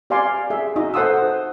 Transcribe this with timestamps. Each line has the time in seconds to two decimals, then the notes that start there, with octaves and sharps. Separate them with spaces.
0.10 G4 D5 F5 G#5 C6 D6
0.50 G#4 E5
0.76 D#4 F#4 D#5
0.94 A4 C5 F#5 C6 D#6 E6